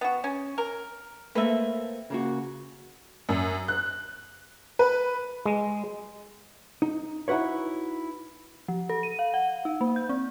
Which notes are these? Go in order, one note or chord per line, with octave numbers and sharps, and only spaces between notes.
B3 F#4
C#4
A#4
A3 A#3 C4 B4 E5
C#3 A#3 F#4
F#2
F#6
B4
G#3
D#4
D#4 E4 F#4 B4 C#5
F3
A4
D#7
F5
F#5
D#4
A#3
G6
C4